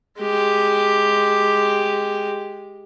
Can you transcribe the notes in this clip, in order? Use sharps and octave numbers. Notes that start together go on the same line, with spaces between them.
G#3 G4